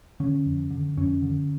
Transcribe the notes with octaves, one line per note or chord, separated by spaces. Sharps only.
D3 C#4
F2
D3
F2 C#4
D3